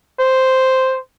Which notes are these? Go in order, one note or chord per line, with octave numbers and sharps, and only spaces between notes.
C5